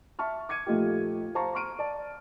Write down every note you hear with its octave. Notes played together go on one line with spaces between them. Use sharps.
E5 A5 C#6 F6
D6 G#6 C#7 D#7
A#2 F3 A3 D#4 F4 G4
C5 F5 A5 A#5 C#6
A#5 C6 C#6 F6 D7 D#7
D5 A5